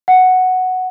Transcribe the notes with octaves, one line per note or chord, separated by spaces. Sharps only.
F#5